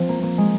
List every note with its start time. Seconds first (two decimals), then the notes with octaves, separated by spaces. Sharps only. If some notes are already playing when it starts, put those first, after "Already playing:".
Already playing: F3 C4
0.09 A#3
0.23 A#3
0.38 G#3